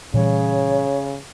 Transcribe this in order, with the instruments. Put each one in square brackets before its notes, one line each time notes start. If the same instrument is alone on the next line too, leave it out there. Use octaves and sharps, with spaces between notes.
[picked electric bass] A#2 E3 G3 [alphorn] C#3 [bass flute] C#5